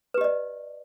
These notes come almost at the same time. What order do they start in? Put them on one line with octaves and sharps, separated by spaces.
B4 G4 D#5 D5